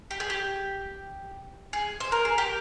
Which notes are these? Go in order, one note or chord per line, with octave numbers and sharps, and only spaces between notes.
G4
G#4
G4
G#4
C5
A#4
G#4
G4 A#4